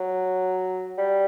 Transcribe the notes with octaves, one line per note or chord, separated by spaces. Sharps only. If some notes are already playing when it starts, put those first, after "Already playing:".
Already playing: F#3
G3